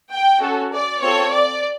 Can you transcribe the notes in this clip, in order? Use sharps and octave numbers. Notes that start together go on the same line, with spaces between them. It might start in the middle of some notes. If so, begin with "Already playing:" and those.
G5
C#4 F#4 A4
D5
C4 F4 A4 C#5
D5